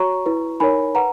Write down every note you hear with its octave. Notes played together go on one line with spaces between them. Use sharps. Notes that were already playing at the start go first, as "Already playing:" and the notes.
Already playing: F#4 C#5 A#5 C#6
E4 B4
D#4 A#4 C#5 G#5 B5
B4 F#5 A#5